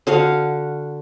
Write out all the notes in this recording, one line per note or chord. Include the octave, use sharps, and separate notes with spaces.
D3 F#4 F5